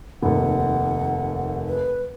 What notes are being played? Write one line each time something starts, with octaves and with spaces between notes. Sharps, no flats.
F1 D#2 F#5
B4